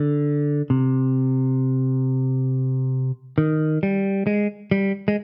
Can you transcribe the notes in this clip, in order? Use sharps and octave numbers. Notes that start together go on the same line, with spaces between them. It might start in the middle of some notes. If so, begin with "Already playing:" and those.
Already playing: D3
C3
D#3
G3
G#3
G3
G#3